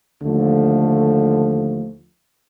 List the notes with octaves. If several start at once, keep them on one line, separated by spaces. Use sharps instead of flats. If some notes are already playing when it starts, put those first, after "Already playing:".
D#2 D3 F3 A3